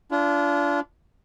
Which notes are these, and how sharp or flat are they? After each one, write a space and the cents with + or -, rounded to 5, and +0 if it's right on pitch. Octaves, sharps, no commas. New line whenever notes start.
D4 -25 F4 -35